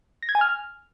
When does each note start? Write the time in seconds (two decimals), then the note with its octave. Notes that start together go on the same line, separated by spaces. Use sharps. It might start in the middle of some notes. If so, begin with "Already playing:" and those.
0.23 A#6
0.29 G#6
0.35 G#5
0.41 F6